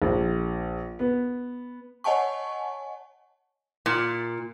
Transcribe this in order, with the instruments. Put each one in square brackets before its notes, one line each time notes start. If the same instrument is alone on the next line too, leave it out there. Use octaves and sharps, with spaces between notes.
[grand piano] A#1
B3
[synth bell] C#5 D#5 F#5 G#5 A5 C#6
[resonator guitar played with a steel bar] A#2